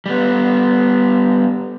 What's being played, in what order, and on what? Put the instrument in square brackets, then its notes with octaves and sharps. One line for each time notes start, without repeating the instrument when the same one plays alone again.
[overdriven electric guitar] G3 B3